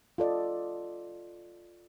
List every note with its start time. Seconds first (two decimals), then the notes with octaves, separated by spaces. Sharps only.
0.18 F4 A4 D5 D#5